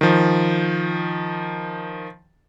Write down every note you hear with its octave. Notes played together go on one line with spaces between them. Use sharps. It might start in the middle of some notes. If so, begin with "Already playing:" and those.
D#3 F3